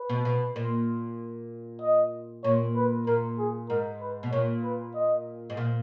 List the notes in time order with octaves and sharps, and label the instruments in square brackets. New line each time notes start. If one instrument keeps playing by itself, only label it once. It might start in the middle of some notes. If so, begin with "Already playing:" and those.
Already playing: [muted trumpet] B4
[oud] B2
B2
A#2
[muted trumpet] D#5
[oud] A#2 [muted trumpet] C#5
[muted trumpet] B4
[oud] A#2 [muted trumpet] A#4
[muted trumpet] G#4
[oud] G#2 [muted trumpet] A#4
[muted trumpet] B4
[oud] B2
[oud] A#2 [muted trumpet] C#5
[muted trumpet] B4
D#5
[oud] G#2
A#2